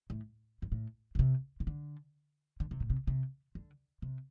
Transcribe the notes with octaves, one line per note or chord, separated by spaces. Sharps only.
A2
G2
A2
A2
C3
C3
D3
D3
C3
A2
C3
C3
D3
C3